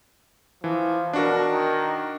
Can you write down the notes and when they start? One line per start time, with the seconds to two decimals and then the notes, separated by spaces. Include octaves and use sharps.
0.64 E3 F3
1.13 B2 D4 F#4 A#4
1.49 D#3